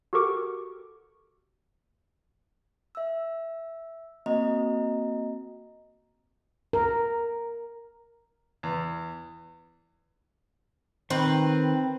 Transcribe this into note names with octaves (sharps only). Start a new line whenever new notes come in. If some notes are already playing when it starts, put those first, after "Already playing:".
F#4 G4 A4 A#4 C#6 D6
E5 E6
A#3 C4 F#4 D#5 A#5
A#4
E2
D#3 C4 B4